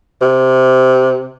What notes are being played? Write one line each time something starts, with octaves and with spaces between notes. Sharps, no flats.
C3